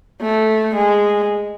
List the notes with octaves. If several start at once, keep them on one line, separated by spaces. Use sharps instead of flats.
A3
G#3